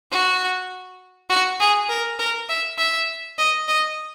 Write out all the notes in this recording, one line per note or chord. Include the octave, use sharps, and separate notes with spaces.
F#4
F#4
G#4
A#4
A#4
E5
E5
D#5
D#5